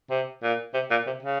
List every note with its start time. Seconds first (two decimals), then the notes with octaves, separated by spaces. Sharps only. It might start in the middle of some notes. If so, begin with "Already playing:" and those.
0.11 C3
0.43 A#2
0.74 C3
0.91 A#2
1.07 C3
1.23 C#3